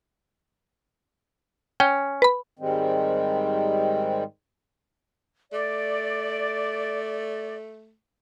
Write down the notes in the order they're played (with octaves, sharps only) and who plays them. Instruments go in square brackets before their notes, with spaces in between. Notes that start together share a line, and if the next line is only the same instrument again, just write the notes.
[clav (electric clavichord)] C#4 [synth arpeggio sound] G5
[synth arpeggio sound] B4 B5
[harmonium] G#2 D#3 G3 G#3 C4
[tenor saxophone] A3 [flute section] D5